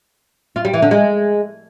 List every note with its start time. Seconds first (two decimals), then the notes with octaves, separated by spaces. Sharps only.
0.56 F4
0.65 G3
0.73 E3
0.82 D3
0.91 G#3